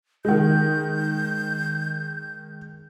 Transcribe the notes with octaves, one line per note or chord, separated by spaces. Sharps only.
D#3 G#3 G6